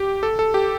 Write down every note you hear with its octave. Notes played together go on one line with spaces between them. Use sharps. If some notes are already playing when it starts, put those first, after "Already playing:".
Already playing: G4
A4
A4
G4